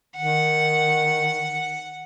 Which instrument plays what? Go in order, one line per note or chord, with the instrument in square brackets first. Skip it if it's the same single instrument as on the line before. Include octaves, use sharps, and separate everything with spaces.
[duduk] D#3 [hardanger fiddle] F#5